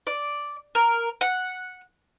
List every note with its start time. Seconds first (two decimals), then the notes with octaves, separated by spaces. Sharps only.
0.07 D5
0.75 A#4
1.21 F#5